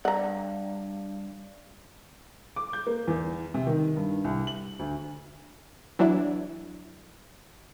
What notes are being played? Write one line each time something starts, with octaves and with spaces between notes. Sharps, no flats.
G2 D5 F#5 A#5
D6
G6
A#3
E2
C3
D#3
G2
C2
F#7
D2
E3 F#3 D4 E4